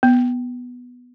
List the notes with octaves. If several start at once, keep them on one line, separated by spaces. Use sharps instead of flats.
B3